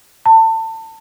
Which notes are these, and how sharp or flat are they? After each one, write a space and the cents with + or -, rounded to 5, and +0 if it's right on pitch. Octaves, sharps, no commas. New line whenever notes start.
A5 +30